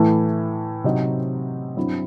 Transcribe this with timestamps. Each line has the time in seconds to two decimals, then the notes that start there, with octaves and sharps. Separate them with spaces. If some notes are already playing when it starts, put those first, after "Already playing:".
Already playing: A2 E3 A3
0.84 C3 F#3 C4 D#4
1.76 G2 F#3 C4 E4